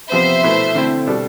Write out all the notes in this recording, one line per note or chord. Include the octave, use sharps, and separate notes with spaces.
C3 F3 B3 C5 E5
B2 A3 E4 B4
D3 A3 C4 E4
B2 G3 D4 A4